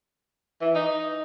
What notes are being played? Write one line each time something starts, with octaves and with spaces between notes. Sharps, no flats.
E3
D#4